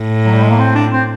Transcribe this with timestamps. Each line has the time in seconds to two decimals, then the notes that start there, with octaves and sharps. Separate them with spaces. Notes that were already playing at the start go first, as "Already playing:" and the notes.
Already playing: A2
0.25 F#3
0.34 G3
0.42 G#3
0.50 A#3
0.59 C4
0.75 D4
0.92 C4